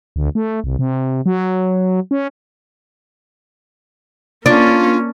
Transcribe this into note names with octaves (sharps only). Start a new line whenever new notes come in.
D2
A3
C2
C3
F#3
C#4
A#3 C#4 D4 F4